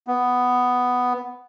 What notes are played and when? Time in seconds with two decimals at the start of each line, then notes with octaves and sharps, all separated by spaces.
0.07 B3